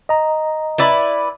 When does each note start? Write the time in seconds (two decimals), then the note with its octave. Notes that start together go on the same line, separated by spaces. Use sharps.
0.09 D#5 A#5
0.78 E4 B4 D5